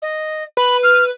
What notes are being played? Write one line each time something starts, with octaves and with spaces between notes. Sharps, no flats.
D#5
B4 B5
F6